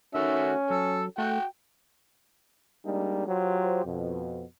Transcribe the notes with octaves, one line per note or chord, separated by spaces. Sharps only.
D#3 A3 C#4 F#4 E5
F#3 A4
A3 F#4 G5
G3 G#3 A#3 D4 D#4
F#3 F4 G4 C5
F2 B2